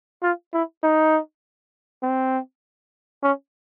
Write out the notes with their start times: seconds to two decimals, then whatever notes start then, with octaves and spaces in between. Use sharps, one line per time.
0.23 F4
0.53 E4
0.83 D#4
2.03 C4
3.23 C#4